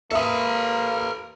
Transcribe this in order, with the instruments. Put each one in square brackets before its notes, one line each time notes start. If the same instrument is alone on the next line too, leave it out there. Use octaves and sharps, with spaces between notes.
[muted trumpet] A#3 [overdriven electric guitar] A4 B4 [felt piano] E5 D#6